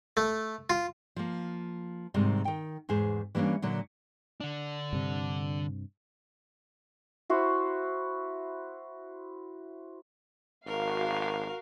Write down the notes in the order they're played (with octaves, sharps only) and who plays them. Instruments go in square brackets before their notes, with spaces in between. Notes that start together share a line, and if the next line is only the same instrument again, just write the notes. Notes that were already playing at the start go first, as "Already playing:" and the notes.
[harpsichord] A3
F4
[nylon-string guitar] F3 A#3
G#2 C3 D#3 G3
D#3 G5
E2 G#2 G#4 C5
E3 G3 A#3 C#4 D4
A#2 D3 F#3
[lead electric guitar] D3 D4
[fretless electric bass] G2 C3
[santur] E4 F#4 C5 F#5
[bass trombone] G#1 [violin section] F#4 F5 [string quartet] A#4